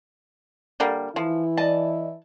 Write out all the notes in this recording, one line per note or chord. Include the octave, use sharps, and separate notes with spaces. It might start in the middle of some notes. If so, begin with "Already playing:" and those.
D3 G3 A#3
E3 F3 E4
D5 D#5 A5